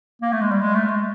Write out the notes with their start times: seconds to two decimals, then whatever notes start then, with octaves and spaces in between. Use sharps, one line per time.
0.22 A#3
0.32 A3
0.41 G#3
0.51 G3
0.61 G#3
0.75 A3
0.88 G#3